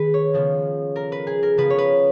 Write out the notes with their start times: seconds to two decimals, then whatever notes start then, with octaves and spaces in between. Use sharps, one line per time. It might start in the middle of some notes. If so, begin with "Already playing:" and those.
Already playing: D#3 G#4 B4
0.14 C#5
0.33 C#3 F3 G#3 B3
0.96 A#4
1.12 B4
1.27 G#4
1.43 A#4
1.58 C#3 F3 G#3 B3 B4
1.70 C#5
1.78 B4